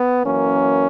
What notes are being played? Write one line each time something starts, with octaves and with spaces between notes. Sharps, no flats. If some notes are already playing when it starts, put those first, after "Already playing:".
Already playing: B3
F#2 E3 A#3 C#4